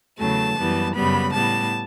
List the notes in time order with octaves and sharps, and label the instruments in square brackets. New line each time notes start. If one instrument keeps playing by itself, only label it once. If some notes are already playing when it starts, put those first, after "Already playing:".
[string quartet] E2 C#3 F#3 A3 A5
F#2 E3 G3 B3
F#2 C#3 G3 B3 B5
A2 G3 B3 A5